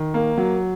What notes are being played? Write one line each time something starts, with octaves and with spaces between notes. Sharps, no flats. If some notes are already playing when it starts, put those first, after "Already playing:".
Already playing: D#3
A#3
F#3